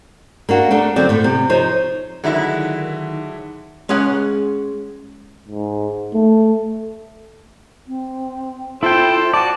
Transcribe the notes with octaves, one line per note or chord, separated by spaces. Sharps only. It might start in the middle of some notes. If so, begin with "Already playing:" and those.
A#3 D4 F#4
A3 D4 A4 A#4
D3 F#3 C4 D5
A2 A3
C3
F3 D#4 C5 C#5
D3 D#3 F#3 G#3 E4 E5
G#3 C#4 G#4 F#5
G#2
A3
C4
E4 F4 A4 C5 G5
F#4 D5 A5